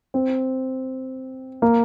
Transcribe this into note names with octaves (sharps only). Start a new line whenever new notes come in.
C4
A#3